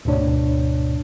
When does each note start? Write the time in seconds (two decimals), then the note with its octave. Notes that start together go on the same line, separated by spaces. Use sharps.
0.05 D2 G#2 B2 D4 C#5